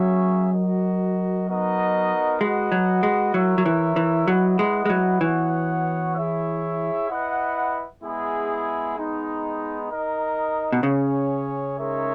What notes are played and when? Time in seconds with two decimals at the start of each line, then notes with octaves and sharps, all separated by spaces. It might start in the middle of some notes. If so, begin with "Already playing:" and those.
Already playing: F#3 A#3 C#4 G#4 C#5 E5
0.53 F#4 A#4 D#5
1.47 B3 D#4 F#4 A#4 D#5
2.41 G#3 F#4 B4 D#5 F#5
2.72 F#3
3.03 G#3
3.34 F#3 E4 A#4 C#5 E5
3.58 F#3
3.66 E3
3.96 E3
4.28 F#3 E4 B4 D#5 F#5
4.59 G#3
4.85 G#3
4.90 F#3
5.21 E3 B3 F#4 C#5 F#5
6.15 E4 G#4 C#5 E5
7.09 E4 B4 D#5 F#5
8.02 G#3 B3 E4 G#4
8.96 G#3 B3 D#4
9.89 D#4 A#4 D#5
10.73 B2
10.83 C#3 C#4 G#4 C#5
11.77 G#3 D#4 A#4 C#5 E5